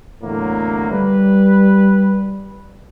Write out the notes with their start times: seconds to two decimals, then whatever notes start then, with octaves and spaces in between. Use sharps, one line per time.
0.23 E2 A2 D3 F#3 A#3
0.91 G3 B4